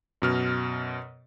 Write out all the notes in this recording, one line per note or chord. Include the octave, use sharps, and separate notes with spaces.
F#2 B2 F6